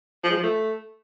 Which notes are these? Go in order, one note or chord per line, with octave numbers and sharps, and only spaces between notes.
F3
G#3
F3
A3